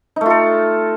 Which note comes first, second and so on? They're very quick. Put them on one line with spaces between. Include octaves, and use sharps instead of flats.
D#4 A3 F4 A4